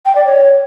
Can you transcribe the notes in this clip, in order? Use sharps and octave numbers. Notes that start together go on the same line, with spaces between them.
G5
D5
C#5